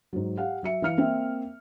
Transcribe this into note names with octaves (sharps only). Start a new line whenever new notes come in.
G#2 F#3
G4 F5 F#5
F#3 E5 C#7
E3 F5 F6 C#7
A#3 C4 E5